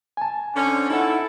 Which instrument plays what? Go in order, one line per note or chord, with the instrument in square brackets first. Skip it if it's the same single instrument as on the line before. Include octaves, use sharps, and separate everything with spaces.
[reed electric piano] G#5 A5
[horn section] D3 C4 C#4
[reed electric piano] D#4 F#5 [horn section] E4 A4